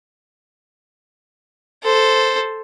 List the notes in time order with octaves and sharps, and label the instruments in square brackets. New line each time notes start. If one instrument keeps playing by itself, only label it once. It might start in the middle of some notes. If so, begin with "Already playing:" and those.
[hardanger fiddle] A4 C5